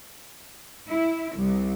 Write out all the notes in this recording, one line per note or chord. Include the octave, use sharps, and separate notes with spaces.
E4
C2